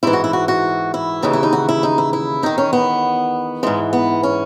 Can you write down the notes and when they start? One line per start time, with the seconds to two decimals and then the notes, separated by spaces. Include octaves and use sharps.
0.03 G#2 E3 E4
0.13 F#4
0.24 E4
0.33 F#4
0.48 F#4
0.94 E4
1.22 D#2 C#3 E3 D#4
1.33 E4
1.43 D#4
1.53 F#4
1.69 E4
1.83 D#4
1.98 E4
2.13 E4
2.43 E2 D#3 D#4
2.58 C#4
2.73 B3
3.63 G#2 E3 G#3
3.93 B3
4.23 C#4